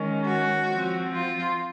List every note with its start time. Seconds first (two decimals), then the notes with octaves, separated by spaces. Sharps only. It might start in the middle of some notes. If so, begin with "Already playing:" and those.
Already playing: D#3 G#3 C#4
0.26 F#4
0.70 F3 C4
1.13 F4